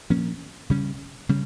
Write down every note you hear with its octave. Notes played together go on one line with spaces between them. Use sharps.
A#2 F3 A#3 C#4
C#3 G3 C#4
C#3 G3 C#4